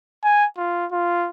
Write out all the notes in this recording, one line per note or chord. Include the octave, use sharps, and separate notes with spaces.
G#5
F4
F4